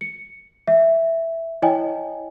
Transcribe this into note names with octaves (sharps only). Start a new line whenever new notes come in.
C#7
E5
E4 C#5 D#5 G5 G#5